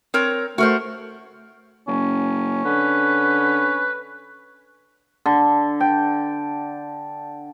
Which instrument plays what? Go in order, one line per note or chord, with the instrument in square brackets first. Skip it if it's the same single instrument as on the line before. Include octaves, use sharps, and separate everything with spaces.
[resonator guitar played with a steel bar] C4 A#4 C#5
[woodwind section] A3 [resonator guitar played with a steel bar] F#4 A#4 C5
[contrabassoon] F#1 [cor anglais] C#4
[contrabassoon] D3 [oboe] B4
[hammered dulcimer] D3
G5